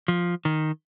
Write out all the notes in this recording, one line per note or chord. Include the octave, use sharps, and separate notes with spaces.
F3
D#3